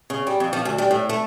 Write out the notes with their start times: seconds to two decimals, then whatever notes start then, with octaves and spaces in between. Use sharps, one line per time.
0.10 C#3
0.27 G3
0.40 F2
0.53 F3
0.65 D2
0.78 G3
0.91 A2
1.09 A3